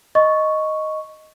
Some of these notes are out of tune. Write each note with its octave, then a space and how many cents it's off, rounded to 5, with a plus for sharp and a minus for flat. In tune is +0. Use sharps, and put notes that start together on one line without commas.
D#5 +0 C#6 +0